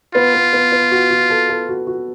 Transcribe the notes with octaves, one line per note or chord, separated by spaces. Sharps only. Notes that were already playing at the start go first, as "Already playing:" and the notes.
B3 F4
B3
B3
B3
F#4
F#4
A4
A4
F#4
F#4